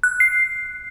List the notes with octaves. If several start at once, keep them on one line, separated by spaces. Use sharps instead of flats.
F#6
C7